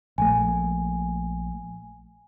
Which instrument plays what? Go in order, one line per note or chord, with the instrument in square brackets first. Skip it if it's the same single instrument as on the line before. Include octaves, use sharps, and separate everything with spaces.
[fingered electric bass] A#1 A3 [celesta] G#5